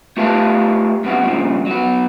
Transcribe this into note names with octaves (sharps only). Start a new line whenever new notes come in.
A3 F4 G4 B4 F5 A5
F#2 C3 B3 F#4
G2 A#2 C#3 F3
F#3 B3